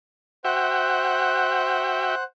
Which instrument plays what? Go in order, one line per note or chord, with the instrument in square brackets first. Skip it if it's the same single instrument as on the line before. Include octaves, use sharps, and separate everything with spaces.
[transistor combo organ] F#4 E5 G5 [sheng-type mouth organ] C5 F#5 F#6